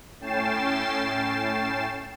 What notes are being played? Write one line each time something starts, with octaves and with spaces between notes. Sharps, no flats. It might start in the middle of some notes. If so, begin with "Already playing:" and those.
A2 C#4 G5 A6 C7 E7